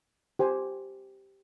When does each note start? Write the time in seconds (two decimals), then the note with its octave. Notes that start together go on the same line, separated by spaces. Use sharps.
0.39 G4 C5 G#5